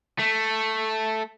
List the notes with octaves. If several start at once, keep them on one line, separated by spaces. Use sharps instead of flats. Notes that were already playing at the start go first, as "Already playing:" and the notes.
A3